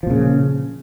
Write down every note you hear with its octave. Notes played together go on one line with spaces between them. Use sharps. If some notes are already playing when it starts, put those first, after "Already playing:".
A#2 C#3 F3